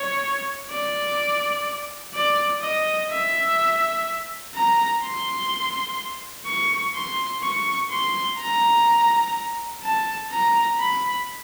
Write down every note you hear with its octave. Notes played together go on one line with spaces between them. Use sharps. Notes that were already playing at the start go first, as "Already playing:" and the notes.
Already playing: C#5
D5
D5
D#5
E5
A#5
C6
C#6
C6
C#6
C6
A#5
A5
A#5
B5